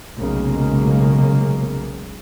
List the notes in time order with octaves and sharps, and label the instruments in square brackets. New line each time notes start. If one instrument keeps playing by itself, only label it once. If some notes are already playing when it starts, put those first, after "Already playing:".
[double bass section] F1 B1 C#3 G#3 A#3